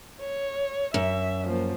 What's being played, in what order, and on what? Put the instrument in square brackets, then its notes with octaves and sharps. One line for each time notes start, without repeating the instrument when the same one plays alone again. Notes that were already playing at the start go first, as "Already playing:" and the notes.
[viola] C#5
[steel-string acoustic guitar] F#2 [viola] E5
[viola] F3 A#3